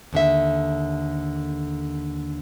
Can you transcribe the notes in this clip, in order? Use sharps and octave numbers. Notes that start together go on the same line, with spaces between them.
D#2 D3 E5